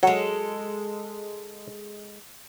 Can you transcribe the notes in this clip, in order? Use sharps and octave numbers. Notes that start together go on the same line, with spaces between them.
F#3 G#3 A4